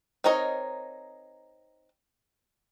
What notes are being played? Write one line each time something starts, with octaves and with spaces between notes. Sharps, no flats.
C4 D#4 A#4 C#5 D#5